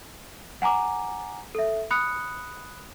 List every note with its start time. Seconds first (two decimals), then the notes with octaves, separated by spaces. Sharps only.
0.62 F#5 G#5 A#5 D6
1.55 A4 E5
1.91 B5 D#6 F#6 C#7